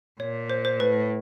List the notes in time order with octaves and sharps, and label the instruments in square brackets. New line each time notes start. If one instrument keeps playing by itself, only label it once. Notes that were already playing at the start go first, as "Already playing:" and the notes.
[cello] A#2 [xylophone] C#5
[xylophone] C5
C5
[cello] A2 [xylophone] B4